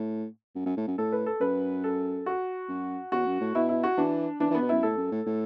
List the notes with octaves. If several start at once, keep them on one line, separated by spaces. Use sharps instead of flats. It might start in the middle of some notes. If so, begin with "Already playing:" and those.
Already playing: A2
F#2
F#2
A2
F#2
A2 A4
B4
A4
F#2 B4
A4
F#4
F#2
E2 F#4
F#2
A2
B2 E4
E4
F#4
E3 D4
E3 D4
E3
B3
B2
F#2 E4
A2 A4
F#2
A2
A2